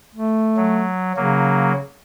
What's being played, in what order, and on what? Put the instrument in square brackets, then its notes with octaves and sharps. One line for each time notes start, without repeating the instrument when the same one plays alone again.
[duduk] A3
[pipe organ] F#3
[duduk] C#3 [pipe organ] F#3 A#3